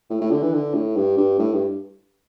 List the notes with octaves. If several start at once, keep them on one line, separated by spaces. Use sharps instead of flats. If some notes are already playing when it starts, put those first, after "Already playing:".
A2
A2
D3
E3
D3
A2
G2
G2
A2
G2